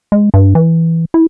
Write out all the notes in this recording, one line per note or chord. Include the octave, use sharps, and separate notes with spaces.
G#3
G2
E3
E4